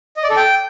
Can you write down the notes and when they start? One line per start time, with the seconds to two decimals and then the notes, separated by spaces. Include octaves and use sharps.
0.17 D#5
0.23 D5
0.30 A4
0.37 G5